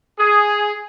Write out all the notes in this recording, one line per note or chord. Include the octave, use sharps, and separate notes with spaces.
G#4